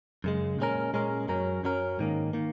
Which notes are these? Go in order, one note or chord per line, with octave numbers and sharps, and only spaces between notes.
F#2 C#3 G#3
A#2 G#3 C#4 A#4
A#2 G#3 C#4 A#4
F#2 F#3 C#4 A#4
F#2 F#3 C#4 A#4
G#2 D#3 A#3
D#3 A#3